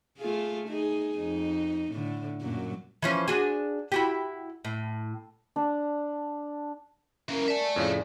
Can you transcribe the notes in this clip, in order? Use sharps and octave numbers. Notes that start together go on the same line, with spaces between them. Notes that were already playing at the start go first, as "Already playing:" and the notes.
A3 F4 G#4
D#4 G#4
F2 D#4
A2 D3
F#2 A#2 F#3
E3 F3 C#4
D4 F#4 G#4
E4 F#4 G4
A2
D4
E3 A#3 C#4 A#4
D5 E5 G#5 A5
F2 A2 C#3